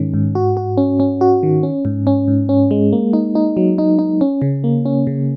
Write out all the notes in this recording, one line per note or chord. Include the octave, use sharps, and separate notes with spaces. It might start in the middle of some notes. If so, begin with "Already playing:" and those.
Already playing: G#2 D#3 G#3 C#4
G#2
F#4
F#4
C#4
C#4
F#4
D#3
C#4
G#2
C#4
G#2
C#4
G#3
A#3
D#4
D#4
F#3
D#4
D#4
C#4
C#3
A#3
C#4
C#3